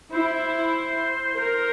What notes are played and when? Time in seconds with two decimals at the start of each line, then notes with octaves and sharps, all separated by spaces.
0.13 E4 C5
1.37 A#4 C5